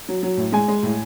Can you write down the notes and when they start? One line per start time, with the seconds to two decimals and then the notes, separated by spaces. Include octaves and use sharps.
0.09 F#3
0.23 F#3
0.37 A2
0.52 G#3 G#5
0.68 G#3
0.83 A2